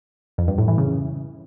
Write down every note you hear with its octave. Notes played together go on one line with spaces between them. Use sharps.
F2
G2
A2
E3
C#3